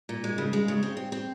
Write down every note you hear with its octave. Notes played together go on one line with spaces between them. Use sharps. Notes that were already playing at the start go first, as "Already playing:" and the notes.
A#2
G#3
C#3
G#3
C#3
C4
C4
C4